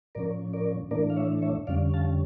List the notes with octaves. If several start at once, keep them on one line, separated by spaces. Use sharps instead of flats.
A2 F3 C#4 A#4 D5
A#4 D5
A2 E3 A3 D4 A#4 D5
F5
C#5 E5
C#5 E5
F2 D3 G3 C#4 D5 F5
F5 A5